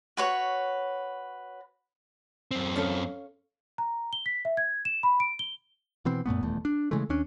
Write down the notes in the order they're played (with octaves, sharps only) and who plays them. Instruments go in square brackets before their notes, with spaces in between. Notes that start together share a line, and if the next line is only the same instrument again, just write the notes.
[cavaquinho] F#4 B4 C#5
[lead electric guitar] F#2 C4
[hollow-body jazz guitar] C#4 A4 F5
[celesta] A#5
G7
B6
E5
G#6
E7
B5
D7
G7
[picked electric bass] B2 E3 C4
F#2 A#2 A3 B3
D#1 E2 A3
D4
C#3 E3 G#3 A3
D#2 C#4 D4